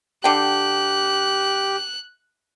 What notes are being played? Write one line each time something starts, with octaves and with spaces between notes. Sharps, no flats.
D3 G4 G5 F#6